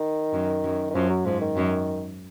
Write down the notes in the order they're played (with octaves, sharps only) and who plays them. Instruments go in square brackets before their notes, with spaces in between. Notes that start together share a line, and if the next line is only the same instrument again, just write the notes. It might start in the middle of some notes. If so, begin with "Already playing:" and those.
Already playing: [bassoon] D#3
[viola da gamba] F#2
F#2
[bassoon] D#3
[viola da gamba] F#2 [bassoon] F3
[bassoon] F#3
[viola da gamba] G#2 [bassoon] F3
[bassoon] D#3
[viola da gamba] F#2